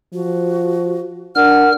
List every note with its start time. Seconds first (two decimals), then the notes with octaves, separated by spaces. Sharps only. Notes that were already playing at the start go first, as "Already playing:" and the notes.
0.14 F3 F#4
1.36 D4 A#4 F#5 F6